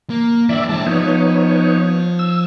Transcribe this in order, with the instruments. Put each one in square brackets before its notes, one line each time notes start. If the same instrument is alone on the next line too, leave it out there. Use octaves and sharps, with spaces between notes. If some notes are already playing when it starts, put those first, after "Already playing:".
[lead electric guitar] A#3
[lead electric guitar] E3 D4 [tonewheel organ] D5 E5
[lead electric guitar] G#3 E4 [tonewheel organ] A5
[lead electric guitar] F3 F4 [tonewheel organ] B3 D#4 C#5
[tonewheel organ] E6